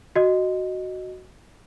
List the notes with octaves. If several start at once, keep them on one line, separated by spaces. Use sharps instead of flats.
F#4 D#5